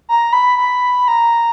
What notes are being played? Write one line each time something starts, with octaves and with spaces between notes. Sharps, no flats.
A#5
B5
B5
A#5